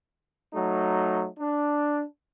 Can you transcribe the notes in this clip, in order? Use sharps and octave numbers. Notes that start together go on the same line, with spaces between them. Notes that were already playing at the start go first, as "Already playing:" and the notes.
F#3 A3 D#4
D4